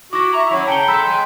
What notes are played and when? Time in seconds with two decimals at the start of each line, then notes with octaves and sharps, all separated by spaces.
0.13 E4 F#4 D6 A#6
0.33 E5 A#5 C#6
0.51 F#3 C#4 E4 C#5
0.67 C#3 G5 A5 A#5 C#7 G7
0.88 G#3 A4 B5 E6 B6
1.07 G#3 G#5